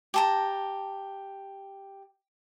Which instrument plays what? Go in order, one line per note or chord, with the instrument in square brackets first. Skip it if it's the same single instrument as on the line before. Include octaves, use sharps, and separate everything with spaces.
[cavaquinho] G4 A5 A#5